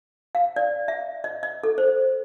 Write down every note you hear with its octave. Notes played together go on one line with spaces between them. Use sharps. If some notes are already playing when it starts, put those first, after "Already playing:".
F5
D5
E5
D#5
D#5
A4
C5